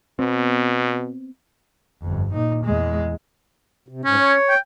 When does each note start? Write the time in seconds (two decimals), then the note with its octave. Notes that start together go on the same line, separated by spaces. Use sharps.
0.19 B2 B3 C4
2.02 G1 F2
2.33 A#2 D#4
2.64 E2 G#3
3.88 C3
4.05 G#2 C#4
4.18 C#5
4.49 G5